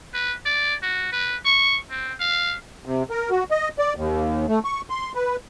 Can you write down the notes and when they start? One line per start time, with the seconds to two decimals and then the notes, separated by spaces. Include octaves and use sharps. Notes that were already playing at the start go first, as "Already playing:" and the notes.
0.14 B4
0.46 D5
0.82 F#4
1.12 B4
1.45 C#6
1.90 C4
2.20 F5
2.85 C3
3.10 A#4
3.30 F#4
3.51 D#5
3.79 D5
3.96 D#2
4.48 A3
4.64 C#6
4.90 C6
5.15 B4